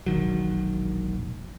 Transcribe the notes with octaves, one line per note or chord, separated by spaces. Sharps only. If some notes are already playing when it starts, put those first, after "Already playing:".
E1 A#1 D#3 F#3